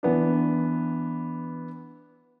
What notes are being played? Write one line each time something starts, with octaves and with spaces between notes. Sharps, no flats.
E3 B3 D4